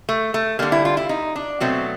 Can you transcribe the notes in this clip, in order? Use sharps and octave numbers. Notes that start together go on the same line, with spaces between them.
A3
A3
D3 G3 A#3
E4
F4
E4
D#4
D4
B2 F#3 A3 C4